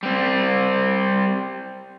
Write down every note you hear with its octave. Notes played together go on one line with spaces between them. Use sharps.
G3 C4